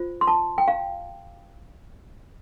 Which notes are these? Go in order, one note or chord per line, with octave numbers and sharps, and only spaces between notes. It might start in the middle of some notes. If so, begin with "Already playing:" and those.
Already playing: F4 C5
C6
A5
G5
F5